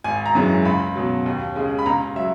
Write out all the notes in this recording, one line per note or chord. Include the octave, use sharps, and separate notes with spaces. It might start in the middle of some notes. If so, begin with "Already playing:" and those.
G#1 G#5
A#5
F#2 E3 G#3
C#2 B5
B2 F#3
D#2
C#3 G#3
B5
C#2 A#5
F#3 E5